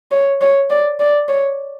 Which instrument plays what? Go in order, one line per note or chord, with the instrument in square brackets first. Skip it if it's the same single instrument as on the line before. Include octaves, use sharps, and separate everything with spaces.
[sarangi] C#5
C#5
D5
D5
C#5